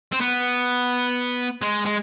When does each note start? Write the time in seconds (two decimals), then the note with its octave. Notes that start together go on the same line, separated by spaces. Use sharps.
0.12 C4
0.21 B3
1.62 G#3
1.86 G#3